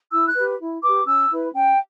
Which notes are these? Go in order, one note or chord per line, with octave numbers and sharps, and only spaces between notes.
E4 E6
F#6
G4 B4
E4
G4 B4 D6
C#4 E6
E4 B4
C#4 G5